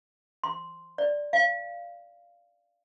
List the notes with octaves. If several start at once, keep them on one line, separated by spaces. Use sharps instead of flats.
C6
D5
F5